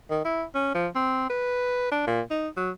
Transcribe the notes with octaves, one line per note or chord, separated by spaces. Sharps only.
D#3
E4
C#4
F3
C4
B4
D4
A#2
D#4
F#3